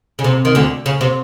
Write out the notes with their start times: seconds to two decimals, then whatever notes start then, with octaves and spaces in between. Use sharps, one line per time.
0.19 C#3
0.24 C3
0.45 D#3
0.55 D2 D3
0.86 C#3
1.01 C3